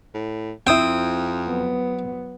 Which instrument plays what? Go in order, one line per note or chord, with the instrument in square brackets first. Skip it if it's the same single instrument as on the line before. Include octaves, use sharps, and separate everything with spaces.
[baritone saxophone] A2
[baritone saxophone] F2 [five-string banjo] C4 E4 [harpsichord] G5 D#6
[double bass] F#3 B3